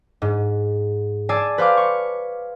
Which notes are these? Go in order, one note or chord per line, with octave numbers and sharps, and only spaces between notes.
G#2
D5 G#5 A5 E6 C7
B4 C5 F5 D6
C#6